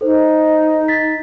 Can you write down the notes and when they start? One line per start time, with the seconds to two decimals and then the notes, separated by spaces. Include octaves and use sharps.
0.01 D#4 A4 C5
0.88 A6 B6